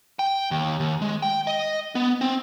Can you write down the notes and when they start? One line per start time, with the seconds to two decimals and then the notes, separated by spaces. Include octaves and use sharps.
0.19 G5
0.51 D#2
0.80 D#2
1.02 G#3
1.22 G5
1.47 D#5
1.95 B3
2.21 C4